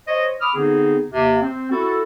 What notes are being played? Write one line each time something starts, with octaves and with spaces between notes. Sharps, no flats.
C5 C#5 D#5
B5 D6 D#6 F6
D3 B3 C4 D#4 G#4
D#2 C3
C4
E4 F#4 A4